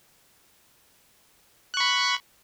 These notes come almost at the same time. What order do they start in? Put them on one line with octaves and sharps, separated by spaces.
F#6 C#6 B5